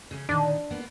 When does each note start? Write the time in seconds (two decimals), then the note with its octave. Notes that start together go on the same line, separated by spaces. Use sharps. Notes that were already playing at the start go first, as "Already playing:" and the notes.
0.11 C#3 A3 C#4
0.29 A#2 D3 D#3 D4
0.71 A#3 B3 F4